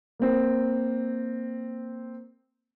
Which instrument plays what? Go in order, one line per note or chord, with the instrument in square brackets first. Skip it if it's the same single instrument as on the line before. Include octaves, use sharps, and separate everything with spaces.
[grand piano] A#3 C4